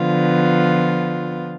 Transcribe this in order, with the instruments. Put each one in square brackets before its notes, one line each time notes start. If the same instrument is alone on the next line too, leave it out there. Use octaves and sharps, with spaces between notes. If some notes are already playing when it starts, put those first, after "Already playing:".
Already playing: [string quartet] D3 F3 B3 F4